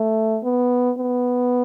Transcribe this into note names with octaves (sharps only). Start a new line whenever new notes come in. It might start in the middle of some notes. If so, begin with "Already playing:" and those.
Already playing: A3
B3
B3